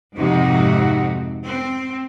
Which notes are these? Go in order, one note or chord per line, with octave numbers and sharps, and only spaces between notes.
F2 G#2 C3 C4 D#4 F#4
C4